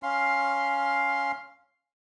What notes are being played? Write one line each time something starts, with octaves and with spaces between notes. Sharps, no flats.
C#4 F5 C6